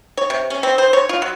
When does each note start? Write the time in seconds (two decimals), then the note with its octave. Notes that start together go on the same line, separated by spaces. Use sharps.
0.17 C#5
0.30 C3
0.50 C#4
0.63 C4
0.78 C5
0.93 C#5
1.09 F4
1.22 F#3